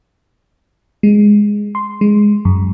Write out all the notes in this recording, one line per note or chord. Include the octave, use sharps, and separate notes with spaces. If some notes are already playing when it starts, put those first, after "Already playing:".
G#3
C6
G#3
F#2